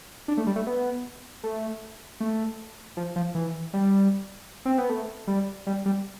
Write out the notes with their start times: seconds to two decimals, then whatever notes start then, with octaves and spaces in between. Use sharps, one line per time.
0.28 D4
0.37 A3
0.47 G3
0.56 A3
0.67 B3
1.43 A3
2.20 A3
2.97 F3
3.16 F3
3.35 E3
3.73 G3
4.65 C4
4.78 B3
4.89 A3
5.27 G3
5.67 G3
5.86 G3